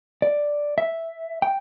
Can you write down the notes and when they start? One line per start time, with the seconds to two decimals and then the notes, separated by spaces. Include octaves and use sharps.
0.22 D5
0.78 E5
1.42 G5